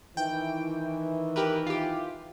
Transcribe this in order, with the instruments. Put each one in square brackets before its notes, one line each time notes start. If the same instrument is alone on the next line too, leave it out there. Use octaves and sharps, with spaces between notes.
[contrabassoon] D#3 [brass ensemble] E3 [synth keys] G5
[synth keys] G4 A#4 B4
F4 G4